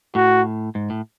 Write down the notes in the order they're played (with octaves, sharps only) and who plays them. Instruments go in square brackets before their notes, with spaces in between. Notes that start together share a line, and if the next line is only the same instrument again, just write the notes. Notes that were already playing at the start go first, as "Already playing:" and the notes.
[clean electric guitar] A2 [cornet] F#4
[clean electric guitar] G#2
A2